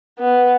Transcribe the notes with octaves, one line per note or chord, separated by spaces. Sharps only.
B3